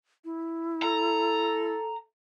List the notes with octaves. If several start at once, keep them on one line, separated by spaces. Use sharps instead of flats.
E4
A4 A#5